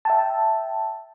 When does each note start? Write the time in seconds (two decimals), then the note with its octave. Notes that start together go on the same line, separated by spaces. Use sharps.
0.05 E5 G5 A5